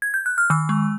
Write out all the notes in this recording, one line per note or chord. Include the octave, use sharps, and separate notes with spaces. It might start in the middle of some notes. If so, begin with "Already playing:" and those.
G#6
G6
F#6
F6
D#3 E6
G#3